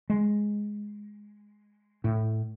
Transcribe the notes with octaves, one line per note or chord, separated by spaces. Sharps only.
G#3
A2